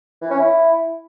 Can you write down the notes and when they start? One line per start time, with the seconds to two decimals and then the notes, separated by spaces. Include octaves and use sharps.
0.22 E3
0.31 C#4
0.39 E4